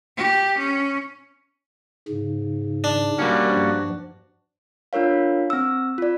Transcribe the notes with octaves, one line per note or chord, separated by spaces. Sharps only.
G4
C#4
G#2 C#3
D4
G3 A#3 C#4 F#4 A#4
G2 F3
D4 F4 A#4 C#5 F5
C4 E6
F4 D5